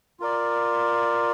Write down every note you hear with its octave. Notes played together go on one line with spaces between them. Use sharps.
F4 A#4 D5